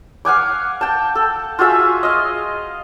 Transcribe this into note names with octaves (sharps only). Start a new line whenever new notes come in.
F5 F#5 G#5 D6
G5 A5
A4
F4 F#4 G#4 E5
D#5 F5